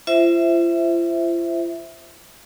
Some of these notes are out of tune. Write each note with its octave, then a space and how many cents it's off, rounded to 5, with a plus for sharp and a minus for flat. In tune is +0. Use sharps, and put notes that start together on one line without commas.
F4 -40 C5 +0 E5 +0